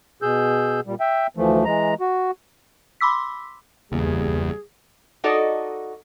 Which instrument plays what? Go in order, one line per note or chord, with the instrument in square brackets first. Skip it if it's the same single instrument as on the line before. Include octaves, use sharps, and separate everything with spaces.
[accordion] B2 G#4 E6 G6
A#2 G3
E5 G5
D2 E3 F3 A3
E3 G#3 A#5
F#4
[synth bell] B5 C6 D6 E6 B6
[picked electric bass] G1 C#3 A#3 [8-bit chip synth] E2 [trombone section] G3 [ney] G#4
[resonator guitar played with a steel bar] D#4 F#4 A4 D5 D#5